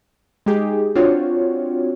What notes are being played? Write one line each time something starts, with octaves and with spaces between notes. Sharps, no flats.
G#3 D#4 G4 G#4
C4 D4 F4 F#4 C#5